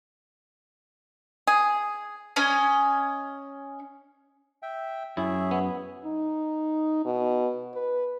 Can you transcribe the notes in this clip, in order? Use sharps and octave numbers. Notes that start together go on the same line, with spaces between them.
G#4
C#4 D#5 G#5
E5 G5
F#2 E4 G#4 C#5 E5
B3
D#4
B2
B4